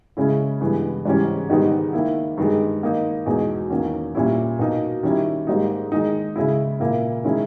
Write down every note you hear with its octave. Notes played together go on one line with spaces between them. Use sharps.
C#3 G#3 C#4 E4
G2 E3 G#3 B3
G#2 E3 G3 C#4
G#2 D#3 G3 B3 D#4
D#3 A#3 E4
G2 D#3 G#3
D#3 A#3 D#4
E2 B2 G#3 D#4
E2 D#3 A#3 C#4
A#2 G3 C#4 E4
B2 A#3 D#4
D#3 G3 C#4 E4
G#2 G3 A#3 D#4
D#3 G#3 D#4
C#3 G#3 C#4 E4
A#2 A#3 E4
D#3 G#3 C#4 E4